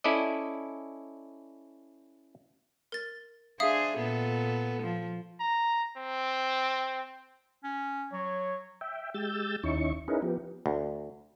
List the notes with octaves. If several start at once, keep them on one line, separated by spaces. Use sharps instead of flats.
C#4 E4 A4 D5 D#5
A#4 A6
D4 G#4 C5 E5 F5 D#6
A#2 B3 A4
F3
A#5
C4
C#4
F#3 C#5
E5 G5
G#3 G4 E6 G6 A6
D#2 C#4 D#4 E4 C#6
C#4 D#4 E4 G#4 A#4 B4
F3 B3 G4
D2